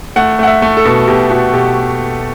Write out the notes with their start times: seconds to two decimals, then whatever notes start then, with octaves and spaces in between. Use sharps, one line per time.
0.16 A3 F#5
0.39 A3 F#5
0.47 E5
0.62 A3
0.77 A4
0.85 B2
1.08 B2 G4
1.30 B2 F#4
1.53 B2 G4